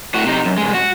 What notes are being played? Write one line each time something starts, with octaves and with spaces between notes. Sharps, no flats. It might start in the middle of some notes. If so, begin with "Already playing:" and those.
A2 F#4
C3 D#4
F#2
C2 G#3
F#4